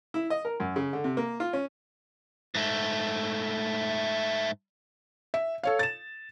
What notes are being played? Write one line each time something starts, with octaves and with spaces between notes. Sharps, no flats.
E4
D#5
A#4
F#2
C#3
D3
C3
A#3
F4
C#4
G#2 A3
E5
A4 C#5 F5
A6 E7